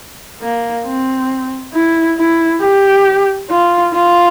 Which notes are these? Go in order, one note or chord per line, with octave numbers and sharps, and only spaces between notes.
A#3
C4
E4
E4
G4
F4
F4